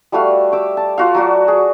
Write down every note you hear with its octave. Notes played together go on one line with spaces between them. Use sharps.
G3 A3 F#4 F5
G4 D6 E6
A5
F4 F#4 F5
F#3 F#4 D5
G#4